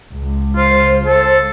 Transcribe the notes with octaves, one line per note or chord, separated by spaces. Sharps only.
C#2
F4 C5
A4